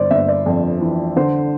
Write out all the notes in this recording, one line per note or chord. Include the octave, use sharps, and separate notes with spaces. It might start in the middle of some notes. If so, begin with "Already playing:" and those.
Already playing: G1 C5 D5
G1 E5
D5
F2
E3
D3 C5